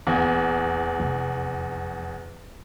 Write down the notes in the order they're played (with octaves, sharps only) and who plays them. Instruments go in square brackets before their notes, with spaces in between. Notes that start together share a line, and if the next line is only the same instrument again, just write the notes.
[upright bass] D#1 [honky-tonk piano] E2
[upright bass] F2 C3